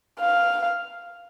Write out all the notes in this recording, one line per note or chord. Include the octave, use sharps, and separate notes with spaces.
F5